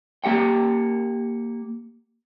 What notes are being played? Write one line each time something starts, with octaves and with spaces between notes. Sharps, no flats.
A#3 G4 F#5 G5